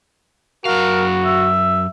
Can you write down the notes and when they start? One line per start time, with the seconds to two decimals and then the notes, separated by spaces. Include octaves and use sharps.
0.65 F#2 F#4 A#4 F5
1.25 E5